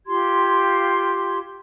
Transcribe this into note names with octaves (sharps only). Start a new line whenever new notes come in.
F4 G4 C6 G#6